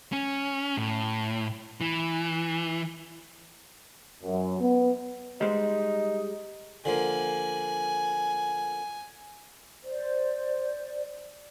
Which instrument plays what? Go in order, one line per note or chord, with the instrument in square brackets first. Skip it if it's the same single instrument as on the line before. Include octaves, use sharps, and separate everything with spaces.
[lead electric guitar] C#4
A2
E3
[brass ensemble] F#2
B3
[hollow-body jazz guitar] G3 G#3 C5 [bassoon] D#4
[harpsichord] D3 F3 A#3 [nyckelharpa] G#5
[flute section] C5 D5